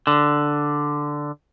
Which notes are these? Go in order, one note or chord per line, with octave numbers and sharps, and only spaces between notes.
D3